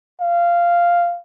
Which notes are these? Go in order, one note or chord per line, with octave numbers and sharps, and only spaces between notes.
F5